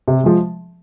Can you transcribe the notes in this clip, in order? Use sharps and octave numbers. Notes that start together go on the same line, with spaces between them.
C3
F3 G#3